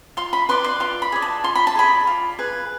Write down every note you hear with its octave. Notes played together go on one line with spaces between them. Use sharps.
F4 C6
B5
B4 D5 C6
C6
F4 C6
B5
G#4 D5
A5
F4 C6
B5
A5
G#4 D5 B5
F4
G#4 B4